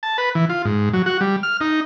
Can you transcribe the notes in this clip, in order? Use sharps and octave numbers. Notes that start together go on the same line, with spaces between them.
A5
B4
E3
F4
G#2
F#3
F#4
G3
F6
D#4